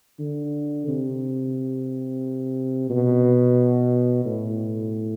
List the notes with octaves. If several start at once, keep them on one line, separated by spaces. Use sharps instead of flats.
D3
C3
B2
A2